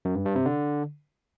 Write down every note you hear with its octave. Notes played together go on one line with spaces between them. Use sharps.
F#2
G2
G2
C3
D3